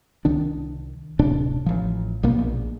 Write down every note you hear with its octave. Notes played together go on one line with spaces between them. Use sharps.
C2 D#3 D4
D1 C3 D4
A1 F3
B1 B2 A#3 B3
A#1